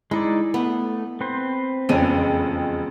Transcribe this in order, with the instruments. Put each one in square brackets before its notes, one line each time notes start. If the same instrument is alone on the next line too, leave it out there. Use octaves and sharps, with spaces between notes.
[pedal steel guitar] G#3 D#4 D5 [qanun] E4
[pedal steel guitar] A3 [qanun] B3
[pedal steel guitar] C4 B4 C5
[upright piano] E1 F2 D#7 [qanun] C#3 D4 C#5